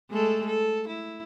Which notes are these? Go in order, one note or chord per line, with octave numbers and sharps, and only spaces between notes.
G#3 A3 A4
A4
E4